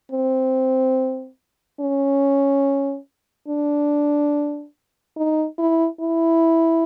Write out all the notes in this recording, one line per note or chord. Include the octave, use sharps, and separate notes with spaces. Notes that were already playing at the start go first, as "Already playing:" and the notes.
C4
C#4
D4
D#4
E4
E4